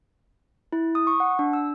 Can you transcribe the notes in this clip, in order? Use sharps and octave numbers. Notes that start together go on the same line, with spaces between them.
E4
D#6
C#6
F#5
D4
E6